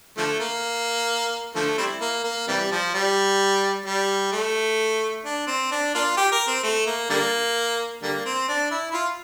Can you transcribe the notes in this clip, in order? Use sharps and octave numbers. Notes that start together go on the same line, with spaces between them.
D3 F3 A3
A#3
D3 F3 A3
G3 C4 E4
A#3
A#3
C3 E3 G3
F3
G3
G3
A3
D4
C4
D4
A#3 D4 F4
G4
A#4
C4
A3
A#3
D3 G3 A#3
D3 G3 A#3
C4
D4
E4
E4
F4